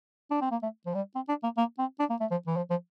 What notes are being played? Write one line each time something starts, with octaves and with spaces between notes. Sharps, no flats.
D4
C4
A#3
A3
F3
G3
C4
D4
A#3
A#3
C4
D4
A#3
A3
F3
E3
F3
F3